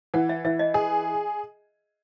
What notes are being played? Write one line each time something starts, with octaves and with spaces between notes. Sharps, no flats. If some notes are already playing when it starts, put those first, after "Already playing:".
E3 F#5
E5
E3 E5
D#5
G#4